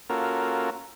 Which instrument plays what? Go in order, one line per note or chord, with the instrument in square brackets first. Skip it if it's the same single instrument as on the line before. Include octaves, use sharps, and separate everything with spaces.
[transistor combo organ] A#3 C#4 F4 F#4 A4 A#4